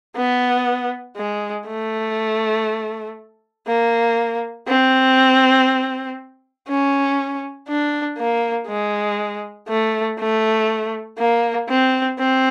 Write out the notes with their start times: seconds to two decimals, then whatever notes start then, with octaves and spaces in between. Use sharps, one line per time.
0.17 B3
1.17 G#3
1.67 A3
3.67 A#3
4.68 C4
6.68 C#4
7.68 D4
8.18 A#3
8.68 G#3
9.69 A3
10.19 A3
11.19 A#3
11.69 C4
12.19 C4